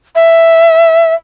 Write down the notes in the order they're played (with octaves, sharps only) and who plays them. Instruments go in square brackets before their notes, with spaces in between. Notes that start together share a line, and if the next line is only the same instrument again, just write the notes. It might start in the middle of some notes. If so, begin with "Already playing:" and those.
[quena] E5